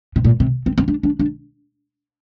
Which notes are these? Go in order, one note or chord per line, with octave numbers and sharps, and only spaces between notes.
C3
A#2
C3
C4
C4
D4
D4
D4